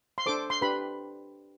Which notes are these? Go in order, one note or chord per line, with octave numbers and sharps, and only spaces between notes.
C6
D4 A4 C5 D6
C6
D4 G4 B4 B5